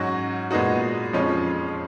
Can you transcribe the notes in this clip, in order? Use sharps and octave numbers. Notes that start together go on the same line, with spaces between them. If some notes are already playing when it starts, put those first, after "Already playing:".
Already playing: G#2 F#3 C#4 F#4
A#2 G#3 B3 D#4 F#4
F2 F3 G#3 C#4